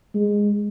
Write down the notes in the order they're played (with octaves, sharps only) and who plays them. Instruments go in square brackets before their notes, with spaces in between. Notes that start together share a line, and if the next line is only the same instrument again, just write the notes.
[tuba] G#3